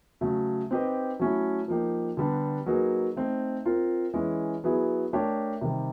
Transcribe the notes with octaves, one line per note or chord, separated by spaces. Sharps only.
C#3 F#3 A3
C4 D#4 G4 B4 D#5
F#3 A3 C#4 E4
F3 A#3 D#4 G4
D3 G3 B3 D4
F#3 A#3 D#4 G#4 B4
A3 C4 D#4
C4 F4 A#4
E3 G#3 C#4
F#3 B3 E4 G#4
A3 D4 G4 A#4 C#5
C3 D#3 G3